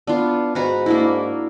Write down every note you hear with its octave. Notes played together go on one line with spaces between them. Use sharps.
B3 D4 F4
G#2 F#4 B4 A#5
A#3 D4 E4